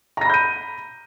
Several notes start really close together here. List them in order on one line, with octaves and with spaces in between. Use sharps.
A#5 A#6 B5 G6 D#7